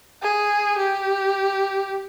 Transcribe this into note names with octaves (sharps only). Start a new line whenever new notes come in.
G#4
G4